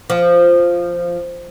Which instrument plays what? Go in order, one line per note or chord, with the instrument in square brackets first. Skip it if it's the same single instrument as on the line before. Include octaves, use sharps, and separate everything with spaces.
[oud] F3